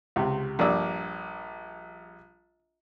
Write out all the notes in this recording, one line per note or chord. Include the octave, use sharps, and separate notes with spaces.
C#2 C3
A#1 G2 A#3 D4 D5 E6